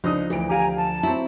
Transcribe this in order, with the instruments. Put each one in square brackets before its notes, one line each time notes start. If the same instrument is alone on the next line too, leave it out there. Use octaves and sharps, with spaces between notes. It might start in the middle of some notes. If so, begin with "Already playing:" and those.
[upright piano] C#2 D4 D#6 [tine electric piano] F3 [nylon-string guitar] D#4
[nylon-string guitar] D2 [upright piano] E3 D7
[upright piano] G4 F5 [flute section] G#5 A#5
[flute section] A5
[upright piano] F#3 C4 [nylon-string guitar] E4